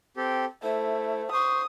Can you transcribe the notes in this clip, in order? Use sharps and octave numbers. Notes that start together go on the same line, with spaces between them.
C4 G4 A4
A3 E4 C5
C5 C#6 D#6